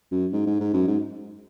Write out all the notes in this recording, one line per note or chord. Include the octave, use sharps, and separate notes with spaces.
F#2
G#2
G#2
G#2
F#2
G#2